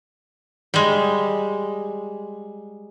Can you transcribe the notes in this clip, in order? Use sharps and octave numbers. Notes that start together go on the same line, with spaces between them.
G3 G#3